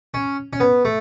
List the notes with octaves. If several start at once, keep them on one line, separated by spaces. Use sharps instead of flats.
C#4
C#4
B3
A3